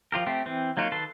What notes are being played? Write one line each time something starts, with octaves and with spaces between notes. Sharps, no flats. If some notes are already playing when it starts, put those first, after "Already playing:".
F3 F4 G4 A#4
A3 C4 G4
E3 C4
F#3 A#3 D#4 F4 F#4
D#3 A4 B4 A5 C6